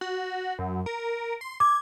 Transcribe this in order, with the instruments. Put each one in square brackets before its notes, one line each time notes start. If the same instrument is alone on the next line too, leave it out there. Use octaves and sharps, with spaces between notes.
[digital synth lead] F#4
F#2
A#4
C6
[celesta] D6 [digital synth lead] G#6